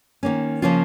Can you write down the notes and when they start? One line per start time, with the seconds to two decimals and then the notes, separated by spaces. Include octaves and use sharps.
0.23 D#3 A#3 C#4
0.62 C#3 F3 A#3 C#4 F4